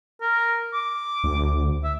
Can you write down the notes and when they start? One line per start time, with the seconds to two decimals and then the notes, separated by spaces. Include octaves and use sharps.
0.21 A#4
0.73 D6
1.24 D2
1.84 E5